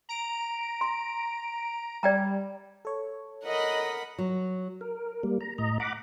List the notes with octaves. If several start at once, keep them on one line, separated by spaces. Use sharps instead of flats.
A#5 D7
C6
G3 D5 G5 A#5
A4 C#5
A#4 D#5 F#5 B5
F#3
A#4
G3 A#3
A#5
A2 D#5 A#5
F#5 A#5 B5 D6